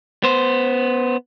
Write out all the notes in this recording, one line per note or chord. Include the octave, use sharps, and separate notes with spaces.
B3 C5